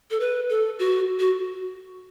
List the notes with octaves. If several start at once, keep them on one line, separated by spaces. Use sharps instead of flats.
A4
B4
A4
F#4
F#4